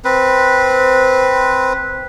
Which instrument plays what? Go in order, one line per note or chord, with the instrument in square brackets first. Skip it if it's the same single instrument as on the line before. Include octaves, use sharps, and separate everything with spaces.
[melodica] C4 B4